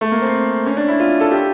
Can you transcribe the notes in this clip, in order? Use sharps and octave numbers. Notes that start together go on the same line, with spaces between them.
A3
A#3
C4
C#4
D4
E4
F4
A4
G4